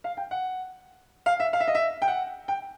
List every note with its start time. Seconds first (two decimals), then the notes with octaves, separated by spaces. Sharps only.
0.04 F5
0.17 G5
0.31 F#5
1.26 F5
1.40 E5
1.53 F5
1.60 E5
1.68 D#5
1.75 E5
2.02 G5
2.08 F#5
2.48 G5